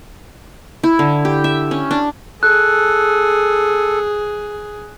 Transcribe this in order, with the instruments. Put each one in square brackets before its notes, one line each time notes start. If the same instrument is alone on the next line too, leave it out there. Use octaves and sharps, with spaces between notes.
[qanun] E4
D3
G4
E5
C#4
D4
[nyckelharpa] G#4 [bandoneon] A4 [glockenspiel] F#6